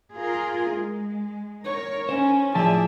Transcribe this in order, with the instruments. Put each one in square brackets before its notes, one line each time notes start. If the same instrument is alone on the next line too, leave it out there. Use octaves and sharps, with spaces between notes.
[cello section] F4 G#4 A#4
G#3
[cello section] A#4 [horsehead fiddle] C#5
[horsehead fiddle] C#4 [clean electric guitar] C5
[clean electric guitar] A2 F3 A5 [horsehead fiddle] G#4 E5 [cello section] D5